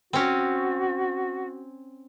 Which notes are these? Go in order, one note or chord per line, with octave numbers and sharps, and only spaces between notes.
C4 C#4 F#4